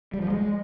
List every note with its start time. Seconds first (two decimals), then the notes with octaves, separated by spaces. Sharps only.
0.14 G3
0.22 F3
0.30 G#3